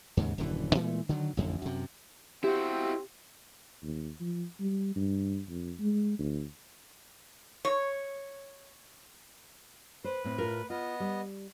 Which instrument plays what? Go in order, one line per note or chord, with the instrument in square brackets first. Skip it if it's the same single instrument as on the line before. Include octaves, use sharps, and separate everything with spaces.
[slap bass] D#2 G#2 C#3
D#1 F#2 D3 E3
A#2 E3 G#3 A3
D3 D#3 F#3
A1 F2 D3
F#2 C3
[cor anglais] C4 [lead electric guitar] E4 F#4 [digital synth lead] G4
[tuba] D#2
F3
G3
G2
F2
G#3
D2
[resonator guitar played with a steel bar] C#5
[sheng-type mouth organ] B4 [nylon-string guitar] C5
[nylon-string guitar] A2 C4
A2 F4 A#4
[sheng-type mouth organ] B3 D#5 [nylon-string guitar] F4
[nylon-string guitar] G3